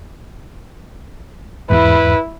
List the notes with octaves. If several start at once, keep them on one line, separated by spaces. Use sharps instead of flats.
E2 G#2 E4 B4